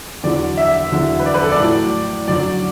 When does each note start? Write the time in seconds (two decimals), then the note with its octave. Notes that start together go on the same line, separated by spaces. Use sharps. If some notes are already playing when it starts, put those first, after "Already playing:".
0.23 E2 D3 F#3 D5
0.57 E5
0.91 E2 D3 F#3
1.19 B4
1.26 D5
1.34 B4
1.42 A4
1.51 D5
1.60 A2 F#3
2.28 F#2 D3 F#3 D5